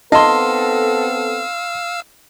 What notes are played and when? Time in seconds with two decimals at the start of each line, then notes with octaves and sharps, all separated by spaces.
0.12 B3 C4 D#4 A4 D#5 F5 C6 E6